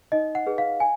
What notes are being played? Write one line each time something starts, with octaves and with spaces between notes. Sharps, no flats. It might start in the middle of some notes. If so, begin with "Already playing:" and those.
D#4 D#5
F#5
G#4 B4
F5
G#5